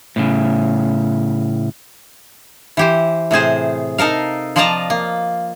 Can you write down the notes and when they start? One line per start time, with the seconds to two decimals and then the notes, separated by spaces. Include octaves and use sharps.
0.16 A2 C#3
2.77 E3 G4 C5
3.31 A2 C3 G#4 C5
3.98 D#4 A4 A#4 F5
4.56 F3 F4 D5 D#5 A5 A#5
4.90 A#3